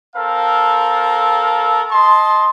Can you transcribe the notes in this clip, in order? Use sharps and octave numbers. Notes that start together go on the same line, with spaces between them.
C4 A4 A#4 F5
D#5 A5 C6